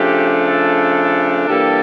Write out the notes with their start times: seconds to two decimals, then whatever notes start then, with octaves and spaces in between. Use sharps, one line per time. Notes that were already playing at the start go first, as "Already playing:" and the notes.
Already playing: C#3 F3 A3 D4 G4
0.44 A4
1.48 G2 E3 G3 A#3 A4